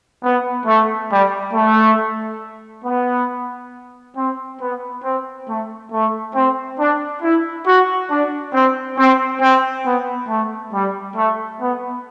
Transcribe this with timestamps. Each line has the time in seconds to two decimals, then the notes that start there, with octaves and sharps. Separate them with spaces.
0.23 B3
0.66 A3
1.10 G3
1.54 A3
2.85 B3
4.16 C4
4.60 B3
5.03 C4
5.47 A3
5.91 A3
6.35 C4
6.79 D4
7.22 E4
7.66 F#4
8.10 D4
8.53 C4
8.97 C4
9.41 C4
9.84 B3
10.28 A3
10.72 G3
11.16 A3
11.60 B3